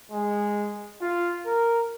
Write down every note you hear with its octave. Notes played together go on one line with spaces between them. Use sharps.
G#3
F4
A#4